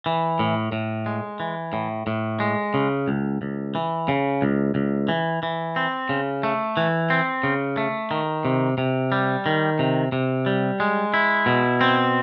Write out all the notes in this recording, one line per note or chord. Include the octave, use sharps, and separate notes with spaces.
E3
A2
A2
G#3
E3
A2
A2
G#3
C#3
C#2
C#2
E3
C#3
C#2
C#2
E3
E3
C4
C#3
A3
E3
C4
C#3
A3
D#3
C3
C3
G3
D#3
C3
C3
G3
G#3
E4
B2
C4